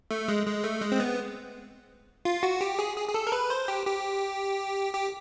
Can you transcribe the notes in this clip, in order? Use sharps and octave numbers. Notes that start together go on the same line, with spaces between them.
A3
G#3
G#3
A3
G#3
C4
B3
F4
F#4
G4
G#4
G#4
G#4
A4
A#4
B4
C5
G4
G4
G4